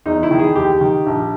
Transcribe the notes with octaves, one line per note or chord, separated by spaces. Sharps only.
E2 D#4
E4
D#3
G#4
D#2 G4
D#3
A#1